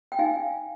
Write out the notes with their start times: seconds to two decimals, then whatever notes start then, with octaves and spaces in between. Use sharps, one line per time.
0.12 G5
0.19 D#4 F5 G#5